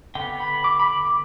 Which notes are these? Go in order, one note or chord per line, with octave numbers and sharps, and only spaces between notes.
D3 B3 G5
B5
D6
B5
D6